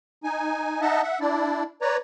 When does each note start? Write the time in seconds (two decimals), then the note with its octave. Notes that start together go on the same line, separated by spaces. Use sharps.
0.24 D#4 G#5
0.81 D#4 D#5 E5 F#5 A5
1.03 E5 F#5
1.20 D4 E4 D5
1.82 B4 C#5 D5 A#5